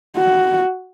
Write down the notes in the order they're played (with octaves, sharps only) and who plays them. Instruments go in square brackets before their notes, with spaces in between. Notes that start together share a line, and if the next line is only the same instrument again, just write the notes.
[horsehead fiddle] F#4